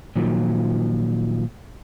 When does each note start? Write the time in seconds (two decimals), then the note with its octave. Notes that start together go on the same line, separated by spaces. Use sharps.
0.16 A#2 D#3 F3 F#3